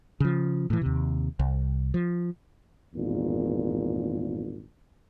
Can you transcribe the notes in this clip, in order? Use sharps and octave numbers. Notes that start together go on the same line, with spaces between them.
C#3 F3
A2 E3
D#2 C3
C2
F3
G#1 E2 G2 A#2